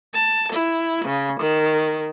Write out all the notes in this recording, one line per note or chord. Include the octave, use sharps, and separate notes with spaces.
A5
E4
C#3
D#3